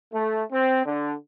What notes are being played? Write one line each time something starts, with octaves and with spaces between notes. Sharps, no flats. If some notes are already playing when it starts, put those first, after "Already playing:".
A3
C4
D3